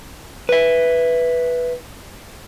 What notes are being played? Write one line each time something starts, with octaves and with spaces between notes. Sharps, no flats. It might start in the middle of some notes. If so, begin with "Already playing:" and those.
B4 E5